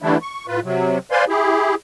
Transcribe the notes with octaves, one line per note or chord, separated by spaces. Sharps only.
D3 E3 G3 A3 D4 E4
C#6
A2 F4 B4
C3 F#3
B4 C5 D5 F5 G#5 C6
E4 G4 G#4